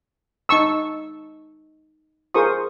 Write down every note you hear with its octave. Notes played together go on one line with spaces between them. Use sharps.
D#4 A5 C#6 E6
F4 G#4 A#4 C5 C#6 D#6